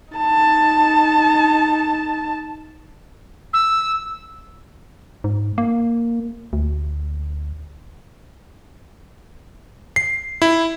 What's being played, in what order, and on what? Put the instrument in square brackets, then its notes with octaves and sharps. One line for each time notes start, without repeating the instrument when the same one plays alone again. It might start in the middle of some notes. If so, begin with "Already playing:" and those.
[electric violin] D#4 A5
[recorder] E6
[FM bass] G#2
A#3
D2
[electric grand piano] C7
E4